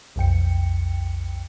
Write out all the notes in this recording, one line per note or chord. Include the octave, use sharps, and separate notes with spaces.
B1 F2 G5 C#7